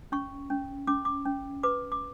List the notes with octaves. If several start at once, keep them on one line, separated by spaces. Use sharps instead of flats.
C#4 C#6
C#4
C#4 D6
D6
C#4
B4 D6
D6